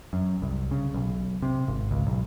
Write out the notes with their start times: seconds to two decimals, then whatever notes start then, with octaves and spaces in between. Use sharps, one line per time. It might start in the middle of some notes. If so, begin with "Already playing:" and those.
0.13 F#2
0.42 C2
0.71 C#3
0.94 B1
1.42 C3
1.68 G#1
1.91 C#2
2.07 B1